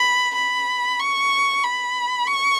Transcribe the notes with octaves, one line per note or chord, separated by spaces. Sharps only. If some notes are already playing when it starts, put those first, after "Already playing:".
Already playing: B5
B5
C#6
B5
C#6